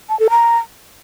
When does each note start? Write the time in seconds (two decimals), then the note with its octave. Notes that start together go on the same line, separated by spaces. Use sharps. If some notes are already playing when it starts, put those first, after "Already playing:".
0.09 A5
0.20 A4
0.30 A#5